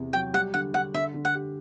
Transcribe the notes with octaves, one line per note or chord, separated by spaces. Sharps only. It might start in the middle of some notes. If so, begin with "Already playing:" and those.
Already playing: E2 C3
F#3 G5
G3 F#5
D3 F#5
D3 F#5
D3 E5
D3
F#5
G4